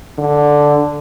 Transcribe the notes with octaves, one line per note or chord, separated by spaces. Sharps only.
D3